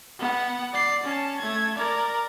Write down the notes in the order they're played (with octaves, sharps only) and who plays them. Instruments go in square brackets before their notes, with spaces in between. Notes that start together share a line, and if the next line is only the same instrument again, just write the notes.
[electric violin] B3 F#5
D5 C7
C#4 A5
A3 G#6
A#4 D5